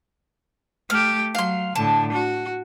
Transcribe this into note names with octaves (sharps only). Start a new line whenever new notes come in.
A3 G4 F6
F#3 F5 C6
A2 D3 A5
F#4